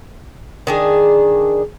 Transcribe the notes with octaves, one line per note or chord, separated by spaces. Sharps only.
D#3 D4 G#4